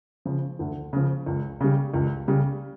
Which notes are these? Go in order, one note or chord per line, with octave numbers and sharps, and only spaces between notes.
C#3 F3
D2
C#3 F3
C#2
C#3 G3
C#2
C#3 G3